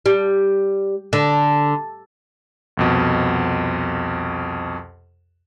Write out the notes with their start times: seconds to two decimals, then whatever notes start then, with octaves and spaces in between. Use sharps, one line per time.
0.06 G3
1.13 D3
2.77 C2 F2 B2